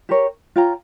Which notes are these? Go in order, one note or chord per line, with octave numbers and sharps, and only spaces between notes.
G4 A#4 C#5
F4 C#5 G5 A#5